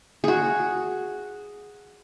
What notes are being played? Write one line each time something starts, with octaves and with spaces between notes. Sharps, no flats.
F#4 G#4